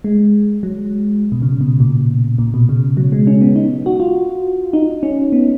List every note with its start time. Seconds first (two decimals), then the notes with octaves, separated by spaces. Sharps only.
0.04 G#3
0.63 F#3
1.32 B2
1.42 C#3
1.61 B2
1.80 A#2
2.39 A#2
2.54 B2
2.69 C#3
2.97 F#3
3.12 G#3
3.27 C#4
3.41 B3
3.56 D#4
3.86 F#4
4.00 F4
4.73 D#4
5.03 C#4
5.32 B3